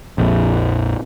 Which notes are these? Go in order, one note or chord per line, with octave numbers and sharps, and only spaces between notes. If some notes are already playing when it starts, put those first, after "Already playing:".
A#1 F2